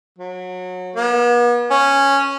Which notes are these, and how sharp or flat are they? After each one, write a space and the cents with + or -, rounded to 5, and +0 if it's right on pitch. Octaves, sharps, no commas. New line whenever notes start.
F#3 -25
B3 -45
C#4 -5